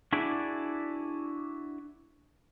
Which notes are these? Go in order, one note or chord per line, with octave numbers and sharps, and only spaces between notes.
D4 E4 F#4 G#4 D5